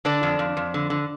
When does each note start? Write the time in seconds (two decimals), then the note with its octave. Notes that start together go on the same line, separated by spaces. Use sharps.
0.05 D3 D4 D5
0.23 F2
0.39 F2
0.57 F2
0.74 D3
0.90 D3